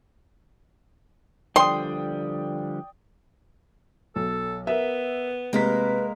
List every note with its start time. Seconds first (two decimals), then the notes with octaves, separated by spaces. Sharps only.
1.56 D3 F3 G3 D5 G5 C6 D#6
4.16 B1 A4
4.67 B3 A#4 E5
5.53 C3 G#3 A#3 A#4 B4 B6